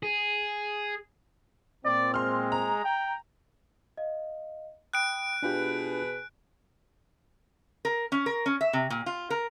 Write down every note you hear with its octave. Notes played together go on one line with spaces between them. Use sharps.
G#4
A#2 C4 D5
G#3 C6 F6
A#5
G5
D#5 F5
G5 B5 D#6 F#6 D7
B2 D4 F4 G4 G#4 B4 G#5 G6
A#4
C#4
A#4
C#4
E5
C3
A#2
F4
A#4